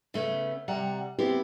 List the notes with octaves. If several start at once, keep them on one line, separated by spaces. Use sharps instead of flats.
C#3 A3 B3 C#4
C3 G3 F#5 A#5
G#3 B3 C4 E4 G4